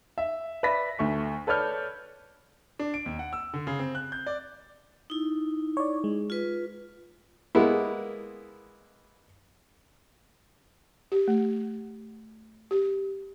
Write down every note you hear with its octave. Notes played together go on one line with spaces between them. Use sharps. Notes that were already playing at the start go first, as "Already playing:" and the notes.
E5
B4 D5 E5 B5 A#6 B6
D2 A3 C#6
A4 B4 C#5 D5 F6 G6
D4
D7
D#2
F#5
E6
D3
C#3
C4
F#6
G6
D5
D#4 E4
C#5 D5
G#3
F4 B4
G#3 A#3 B3 E4
G4
A3
G4